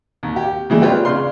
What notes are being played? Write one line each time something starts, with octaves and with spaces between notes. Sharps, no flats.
D#2
G4
C#3 E3 G3 G#3
C#4 D4 F4 B4 F5 G5
C#3 D4 F5 C6